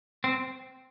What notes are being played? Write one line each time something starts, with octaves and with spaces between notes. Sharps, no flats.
C4